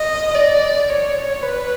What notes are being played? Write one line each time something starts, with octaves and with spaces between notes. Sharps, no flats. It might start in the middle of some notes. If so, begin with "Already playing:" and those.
Already playing: D#5
D5
C#5
B4